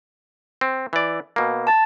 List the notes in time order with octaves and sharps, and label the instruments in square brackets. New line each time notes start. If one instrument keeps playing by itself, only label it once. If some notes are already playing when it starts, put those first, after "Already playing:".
[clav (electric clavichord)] C4
E3 D5
B2 A#3
[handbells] A5 A6